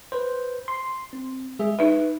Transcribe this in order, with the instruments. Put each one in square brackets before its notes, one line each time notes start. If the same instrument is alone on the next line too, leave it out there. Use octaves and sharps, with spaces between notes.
[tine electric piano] B4 C5
C6
C4
G#3 G#4 E5
[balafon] D#4 E5 [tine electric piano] B4